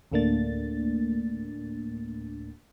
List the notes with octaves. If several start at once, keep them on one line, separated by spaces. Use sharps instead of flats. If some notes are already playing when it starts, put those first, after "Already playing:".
D2 A2 A3 A#3 D4 A6